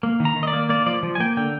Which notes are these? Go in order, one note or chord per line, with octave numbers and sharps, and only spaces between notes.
A#3
D#3
A#5
D#3
D#5
D5
A#3
A#3 D5
F3 D5
F3
G#5
A#3 G5
D3 G5